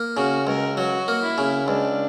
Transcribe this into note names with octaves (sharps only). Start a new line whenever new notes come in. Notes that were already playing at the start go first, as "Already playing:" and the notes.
Already playing: A#3
C#3 F#4
C#2 A#4
F#3 F#4
A#3
E4
C#3
C#2 D4